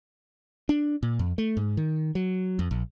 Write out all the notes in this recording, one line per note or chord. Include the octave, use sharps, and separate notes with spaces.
D4
A#2
F2
A3
G#2
D#3
F#3
F2
A#1